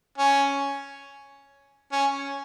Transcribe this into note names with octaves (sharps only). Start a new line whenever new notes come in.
C#4
C#4